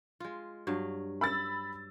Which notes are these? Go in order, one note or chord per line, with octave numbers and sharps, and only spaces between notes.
G#3 F4
G2 F#3 F5
B5 E6 A6